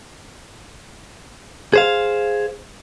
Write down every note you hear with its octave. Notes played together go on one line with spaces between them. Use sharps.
G#4 C5 F5